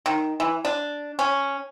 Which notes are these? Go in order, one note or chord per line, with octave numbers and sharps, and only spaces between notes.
D#3
E3
D4
C#4